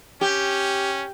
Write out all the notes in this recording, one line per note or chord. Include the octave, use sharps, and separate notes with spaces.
C#4 G4